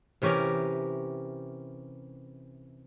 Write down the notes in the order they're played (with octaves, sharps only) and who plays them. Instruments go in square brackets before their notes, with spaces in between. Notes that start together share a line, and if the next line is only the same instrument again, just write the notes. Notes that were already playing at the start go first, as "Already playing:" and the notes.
[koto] C3 E3 C#4 G4 A#4